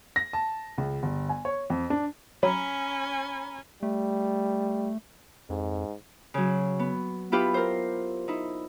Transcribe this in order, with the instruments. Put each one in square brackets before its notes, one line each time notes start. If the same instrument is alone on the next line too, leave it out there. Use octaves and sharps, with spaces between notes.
[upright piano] A#6
A5
C#2
G1
G#5
C#5
F2
D4
[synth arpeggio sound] F#3 [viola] C#4 G#5 [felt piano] A#5 B5
[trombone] G3 [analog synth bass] A3
[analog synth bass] F2 [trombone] G#2
[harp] C#3 F#3
B3
B3 E4 F4 G4 B4
A#4 C5
D#4 E4